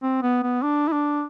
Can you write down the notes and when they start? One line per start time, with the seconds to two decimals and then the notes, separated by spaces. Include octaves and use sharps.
0.02 C4
0.23 B3
0.43 B3
0.62 D4
0.88 E4
0.92 D4